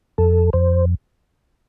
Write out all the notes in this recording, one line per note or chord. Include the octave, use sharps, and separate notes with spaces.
F2 A4
F2 C5